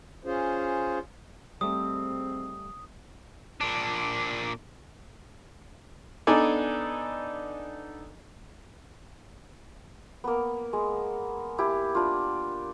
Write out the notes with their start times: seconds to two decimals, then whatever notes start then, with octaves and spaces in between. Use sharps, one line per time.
0.25 C#4 F4 G#4 C5
1.61 G#2 G3 A3 C4 D#6
3.61 A#2 D4
6.27 B3 D4 D#4 A4 D5 G#5
10.24 A#3 B3
10.73 G#3
11.58 E4 G4
11.95 D4 F4